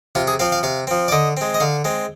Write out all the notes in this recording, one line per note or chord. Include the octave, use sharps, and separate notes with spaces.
C3 F4
G#4
F3 C4 F5
F5
C3 F5
F3 C4
D5
D3 D#5
G#3 C4
D#5
D3 F5
G#3 C4